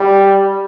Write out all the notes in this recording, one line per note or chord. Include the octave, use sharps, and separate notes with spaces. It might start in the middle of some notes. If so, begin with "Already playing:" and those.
Already playing: G3